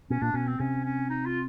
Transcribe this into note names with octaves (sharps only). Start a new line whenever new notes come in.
B2 C#4
A#2 D4
B2 C#4
C4
C3 C#4
C#4
D#4
F4